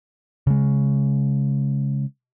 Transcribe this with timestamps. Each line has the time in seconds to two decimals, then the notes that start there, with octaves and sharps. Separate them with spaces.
0.47 C#3 G#3